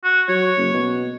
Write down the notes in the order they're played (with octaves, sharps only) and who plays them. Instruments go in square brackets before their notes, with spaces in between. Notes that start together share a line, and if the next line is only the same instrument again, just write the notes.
[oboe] F#4
[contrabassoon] F#3 [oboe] C#5
[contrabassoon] F#1
B2